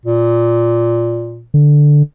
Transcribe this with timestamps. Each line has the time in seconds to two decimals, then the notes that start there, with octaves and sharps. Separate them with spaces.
0.05 A#2
1.54 D3